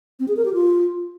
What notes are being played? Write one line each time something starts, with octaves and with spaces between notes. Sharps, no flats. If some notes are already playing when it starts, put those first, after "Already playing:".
C4
G#4
A#4
G4
F4